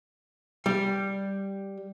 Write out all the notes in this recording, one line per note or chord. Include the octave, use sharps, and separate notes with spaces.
G3